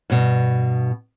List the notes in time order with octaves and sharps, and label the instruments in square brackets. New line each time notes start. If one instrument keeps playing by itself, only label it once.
[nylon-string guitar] G2 B2